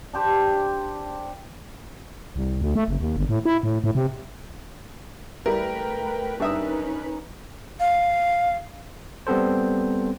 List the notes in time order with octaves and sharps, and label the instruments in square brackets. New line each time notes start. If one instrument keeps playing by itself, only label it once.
[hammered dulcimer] D4 G4 C5
[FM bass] C2
D2
A3
F#1
D#2
G1
A2
E4
A2
A2
C3
[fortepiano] G3 E4 [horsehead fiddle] A3 G5 [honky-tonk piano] A#4 [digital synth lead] B4
[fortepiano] G2 E5 D#6 [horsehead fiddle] C#4 D#4
[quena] F5
[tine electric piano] G3 B3 C4 A4 C5